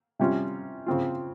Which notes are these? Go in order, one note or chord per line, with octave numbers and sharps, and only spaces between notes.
C3 G3 C#4 F4
C#3 F3 C4 F4